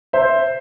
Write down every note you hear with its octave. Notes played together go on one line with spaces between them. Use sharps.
C5 E5